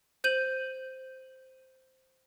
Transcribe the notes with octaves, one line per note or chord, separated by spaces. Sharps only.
C5 G6 D#7 F#7